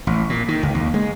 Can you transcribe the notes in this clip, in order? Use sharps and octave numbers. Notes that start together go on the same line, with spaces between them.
A1
A#2
D#3
C#2
D#2
G#3